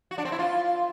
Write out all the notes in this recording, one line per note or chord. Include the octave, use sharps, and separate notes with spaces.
F#4
D4
C4
E4
F4